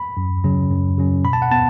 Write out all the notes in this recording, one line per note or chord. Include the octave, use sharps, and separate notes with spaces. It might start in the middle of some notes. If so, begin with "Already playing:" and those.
Already playing: B5
F#2
C#3 F#3 C#4
F#2
C#3 F#3 C#4
B2 B5
A5
F#5
B3 A5